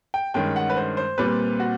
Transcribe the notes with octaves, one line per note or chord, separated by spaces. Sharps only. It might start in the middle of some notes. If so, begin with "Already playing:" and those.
G5
G2 D#3 G#3 C#4 G5
F#5
B4
C5
C5
A#2 G3 C4 B4
F#4